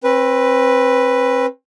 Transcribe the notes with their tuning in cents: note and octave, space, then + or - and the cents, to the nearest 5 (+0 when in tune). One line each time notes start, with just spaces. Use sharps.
C4 +30 B4 +0